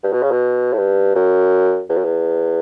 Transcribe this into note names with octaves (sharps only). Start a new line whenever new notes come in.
G2
B2
C#3
B2
A2
G2
F#2
E2
F#2
E2